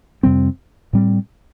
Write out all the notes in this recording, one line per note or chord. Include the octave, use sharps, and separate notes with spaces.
F2 C3 G3 C4
A2 G3 C4